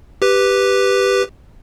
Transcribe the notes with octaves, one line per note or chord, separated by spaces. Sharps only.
G4 B4